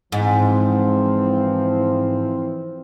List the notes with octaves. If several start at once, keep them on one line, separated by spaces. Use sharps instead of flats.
G#2 E3 F3 C4